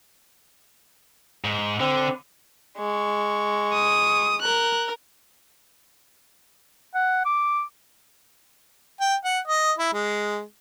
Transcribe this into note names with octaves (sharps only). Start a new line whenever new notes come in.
G#2
D3 C4
G#3 C#6
D#6
A#4 F#6
F#5
D6
G5
F#5
D#5
E4
G#3